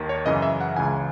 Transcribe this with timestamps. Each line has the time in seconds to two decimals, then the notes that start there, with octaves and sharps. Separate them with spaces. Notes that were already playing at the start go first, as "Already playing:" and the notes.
Already playing: D#2 D#3
0.09 C#5
0.26 F#2 C#3 E3 D#5
0.42 E5
0.61 F#5
0.76 C#2 C#3 E3 G#5